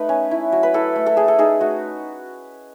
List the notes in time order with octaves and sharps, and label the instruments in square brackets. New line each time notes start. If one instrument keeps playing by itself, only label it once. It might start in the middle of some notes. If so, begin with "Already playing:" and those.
Already playing: [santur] A3 D#4 B4
C#4
E4
F#3
B4
E4 A4
A3
A4
A3 G#4
A4
D#4 G#4
A3 F#4